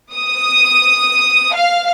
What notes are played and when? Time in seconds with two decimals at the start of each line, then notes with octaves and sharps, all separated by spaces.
0.13 D#6
1.54 F5